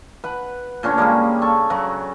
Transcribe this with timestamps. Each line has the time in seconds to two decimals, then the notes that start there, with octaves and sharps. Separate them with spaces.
0.24 B4 F#5
0.83 A#2 D3 C#4 C#5
0.98 C#3 G3 G#3 A#3
1.42 A4 C#6
1.70 C#3 F#3 F#4